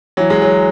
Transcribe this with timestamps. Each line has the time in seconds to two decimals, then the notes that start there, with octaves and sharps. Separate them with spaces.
0.17 E3 F#3
0.30 G#3
0.42 F#3